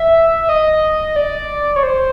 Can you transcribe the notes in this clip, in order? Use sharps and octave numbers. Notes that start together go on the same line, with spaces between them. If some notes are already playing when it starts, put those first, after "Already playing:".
Already playing: E5
D#5
D5
C#5
C5